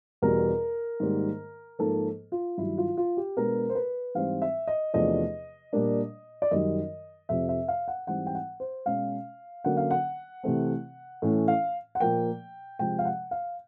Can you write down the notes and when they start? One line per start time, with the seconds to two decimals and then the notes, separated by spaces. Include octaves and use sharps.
0.22 E2 B2 G3 A#4
1.00 G#2 D#3 G3 A#3
1.79 G#2 F3 A#3 A4
2.32 F4
2.58 G2 D#3 F#3 E4
2.78 F4
2.97 F4
3.17 G4
3.37 B2 G#3 B3 D4 A#4
3.70 C5
3.75 B4
4.15 G#2 E3 G3 C4 F5
4.42 E5
4.67 D#5
4.93 E2 C3 F3 A3 D4 D#5
5.73 A#2 G3 A#3 D4
6.42 D5
6.51 F#2 D#3 G3 D#5
7.29 F2 C3 F3 E5
7.49 E5
7.68 F5
7.88 F#5
8.07 G#2 E3 G3 C4 F#5
8.27 G5
8.35 F#5
8.60 C5
8.86 B2 G#3 C#4 F5
9.64 D3 F#3 A#3 C#4 F#5
9.77 F5
9.91 F#5
10.44 C3 E3 A3 C4
11.22 A2 E3 A3 C#4
11.48 F5
11.95 F#5
12.00 A#2 F3 A#3 G5
12.79 C3 F3 G#3 G5
12.99 F5
13.05 F#5
13.31 F5